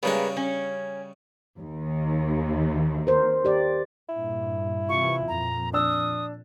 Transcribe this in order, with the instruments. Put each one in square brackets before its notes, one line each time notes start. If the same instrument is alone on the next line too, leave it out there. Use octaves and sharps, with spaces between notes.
[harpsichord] C#3 G3 C#5 [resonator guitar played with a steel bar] G#3 A#3 B3
[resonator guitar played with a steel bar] C#4
[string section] D#2
[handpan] A#4 C5
G4 D5
[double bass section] G2 A#2 [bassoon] E4
[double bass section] C3 E3 [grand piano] F4 [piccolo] C#6
[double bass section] F2 A#2 [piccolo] A#5
[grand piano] D4 E6 [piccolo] D#6